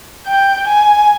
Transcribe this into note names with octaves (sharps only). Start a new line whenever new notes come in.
G5
G#5